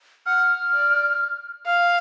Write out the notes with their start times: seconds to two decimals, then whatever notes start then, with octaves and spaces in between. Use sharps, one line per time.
0.26 F#5 F6
0.73 D5
1.66 F5 F6